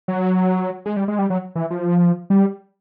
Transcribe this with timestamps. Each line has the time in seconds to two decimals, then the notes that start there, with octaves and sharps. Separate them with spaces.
0.08 F#3
0.86 G#3
0.97 G3
1.08 G#3
1.19 G3
1.30 F#3
1.55 E3
1.70 F3
2.30 G3